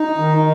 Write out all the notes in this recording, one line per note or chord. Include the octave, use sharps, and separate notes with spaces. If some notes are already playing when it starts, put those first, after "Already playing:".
Already playing: D#4
D#3